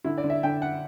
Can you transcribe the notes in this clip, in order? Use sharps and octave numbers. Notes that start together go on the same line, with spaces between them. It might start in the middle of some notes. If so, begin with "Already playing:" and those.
D3 E4
D5
D3
E5
D3 G5
F#5